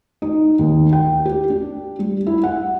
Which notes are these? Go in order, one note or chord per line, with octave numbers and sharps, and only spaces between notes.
D#4
D#2
G5
G4
D4
G3
E4
F#5